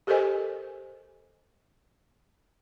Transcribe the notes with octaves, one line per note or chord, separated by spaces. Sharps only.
G4 A4 A#4 C5 D#5 G#5